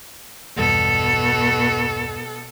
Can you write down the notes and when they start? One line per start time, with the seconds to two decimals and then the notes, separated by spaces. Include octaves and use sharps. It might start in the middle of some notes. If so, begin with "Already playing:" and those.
0.57 B1 E2 G2 B2 A4